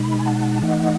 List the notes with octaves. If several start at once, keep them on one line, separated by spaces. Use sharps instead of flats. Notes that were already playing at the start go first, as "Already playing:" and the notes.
Already playing: B2 G#3 D#4 B5
G#5
F#5 A5
E3 A3 D#4 D#5 F#5